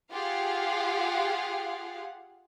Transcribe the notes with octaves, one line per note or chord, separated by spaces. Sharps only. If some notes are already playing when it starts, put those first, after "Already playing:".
F4 G4 G#4 F5 F#5